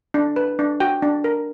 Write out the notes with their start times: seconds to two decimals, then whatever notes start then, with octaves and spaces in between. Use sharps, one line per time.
0.14 D4
0.36 B4
0.59 D4
0.80 F#4 G5
1.02 D4
1.24 A#4